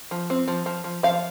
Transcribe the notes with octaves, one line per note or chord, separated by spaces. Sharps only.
F3
C4
F3
F3
F3
F3 F5